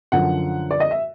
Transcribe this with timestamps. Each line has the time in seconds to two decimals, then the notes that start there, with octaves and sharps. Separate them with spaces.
0.12 F#2 D3 F3 F#5
0.71 D5
0.80 D#5
0.91 E5